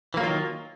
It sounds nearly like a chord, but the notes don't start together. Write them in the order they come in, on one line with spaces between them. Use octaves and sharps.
E3 A#3 F#3 F4 D#3